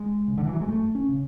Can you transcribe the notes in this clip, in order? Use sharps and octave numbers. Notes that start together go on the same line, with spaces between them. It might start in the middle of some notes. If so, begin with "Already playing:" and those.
Already playing: G#3
C#3
D3
E3
F#3
G#3
F#2 A3
C#4
C#3